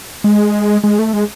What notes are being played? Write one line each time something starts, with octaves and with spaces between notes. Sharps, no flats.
G#3
G#3
A3
G#3